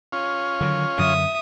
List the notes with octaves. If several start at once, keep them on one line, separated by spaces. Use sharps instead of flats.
C#4 F4
D3 D#3 F#3
F#2 D3 F#3 E5 D#6